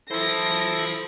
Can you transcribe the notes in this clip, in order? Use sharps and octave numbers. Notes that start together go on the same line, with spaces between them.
E4 A4 C5 A5 A#6 D7